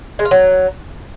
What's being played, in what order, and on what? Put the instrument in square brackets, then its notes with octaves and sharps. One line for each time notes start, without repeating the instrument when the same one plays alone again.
[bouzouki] G#3
F4
F#3